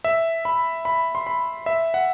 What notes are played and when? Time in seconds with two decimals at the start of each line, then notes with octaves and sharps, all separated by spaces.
0.04 E5
0.45 B5
0.85 B5
1.15 C6
1.27 B5
1.66 E5
1.94 F#5